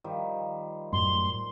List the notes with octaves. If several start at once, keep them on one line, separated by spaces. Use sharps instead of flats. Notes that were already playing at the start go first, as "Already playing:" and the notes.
D#3 F3 G3
F#2 A2 C6